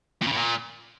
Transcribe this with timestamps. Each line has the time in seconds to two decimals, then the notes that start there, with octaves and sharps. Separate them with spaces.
0.22 A#2
0.27 C#3
0.32 A2
0.37 A#2